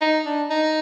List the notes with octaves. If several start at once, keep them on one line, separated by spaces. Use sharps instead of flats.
D#4
D4
D#4